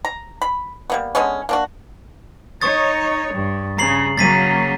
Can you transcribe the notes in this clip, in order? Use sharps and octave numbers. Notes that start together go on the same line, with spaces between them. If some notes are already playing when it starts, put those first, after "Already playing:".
A#5
B5
G3 A#3 B3
D3 G#3 B3 C#4
A#3 D4 F#4
D#4 C#5 C#6 D#6 A6
G2
C#3 A#5 C7 F#7
C#3 F#3 A#3 A6 B6 D#7